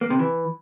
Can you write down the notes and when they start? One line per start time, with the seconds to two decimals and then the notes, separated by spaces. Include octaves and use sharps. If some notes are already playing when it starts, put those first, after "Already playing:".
0.01 A#3
0.10 C3
0.19 E3